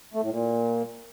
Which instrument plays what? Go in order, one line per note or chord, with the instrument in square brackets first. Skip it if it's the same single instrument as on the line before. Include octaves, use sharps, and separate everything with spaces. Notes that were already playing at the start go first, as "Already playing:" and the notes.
[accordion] A3
A2
A#2